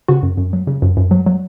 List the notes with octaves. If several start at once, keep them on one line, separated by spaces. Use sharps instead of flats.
C#3 F#4
F#2
F#2
F#3
C#3
F#2
F#2
F#3
F#3